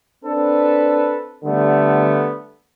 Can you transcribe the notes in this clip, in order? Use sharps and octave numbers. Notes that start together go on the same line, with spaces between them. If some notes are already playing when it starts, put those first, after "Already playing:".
C4 D4 A4 B4
D3 G3 A3 B3